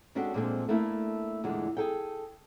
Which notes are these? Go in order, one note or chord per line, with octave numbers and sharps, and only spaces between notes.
G#3 C#4 D4 F#4 G4 A4
A#2 F3 G#3 C4 D4 A4
A3 A#3 D4 E4
E2 A#2 D3 G#3 A3
G#4 A4 G5